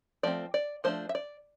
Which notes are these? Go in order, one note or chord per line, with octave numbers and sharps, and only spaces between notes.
F3 A3 C4 D5
D5
F3 A3 D4 C5
E5
D5